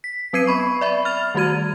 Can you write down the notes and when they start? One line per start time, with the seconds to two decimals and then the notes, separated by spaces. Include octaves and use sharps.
0.04 B6
0.33 F#3 C4 B4 G#6 C7 D#7
0.47 B3 B5 C#6
0.81 D5 E5 B5
1.05 F6 A6 F7
1.35 D#3 G3 A3 F#4 G#6 D#7